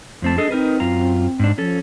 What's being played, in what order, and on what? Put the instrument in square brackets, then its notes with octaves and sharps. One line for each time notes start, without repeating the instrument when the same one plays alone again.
[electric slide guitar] F2 C4 A5 [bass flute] A3
[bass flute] D4 [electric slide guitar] G#4 A4 D#5
[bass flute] C4 [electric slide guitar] D#4 A#4 B4
[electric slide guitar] F#2 F4 A#5
G#2 D4
[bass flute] F3 [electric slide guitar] C#4 A4